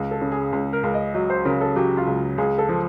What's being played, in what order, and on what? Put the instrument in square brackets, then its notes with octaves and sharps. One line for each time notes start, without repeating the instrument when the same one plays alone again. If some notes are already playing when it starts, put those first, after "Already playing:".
Already playing: [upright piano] C#2
[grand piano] A4
[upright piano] C#3
[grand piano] G#4
[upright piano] C#2
[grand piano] A#4
[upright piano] C#2
[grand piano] D#5
[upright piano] F#3 [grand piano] D#5
[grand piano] C5
[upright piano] C#3 [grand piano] A#4
[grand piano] A4
[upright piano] F#3 [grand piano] G4
[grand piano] F4
[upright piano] C#2
[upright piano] C#2 [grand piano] G#4
[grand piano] A4
[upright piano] F3